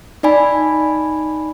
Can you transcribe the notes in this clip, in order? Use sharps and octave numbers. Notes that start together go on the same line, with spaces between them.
D#4 D5 G#5 B5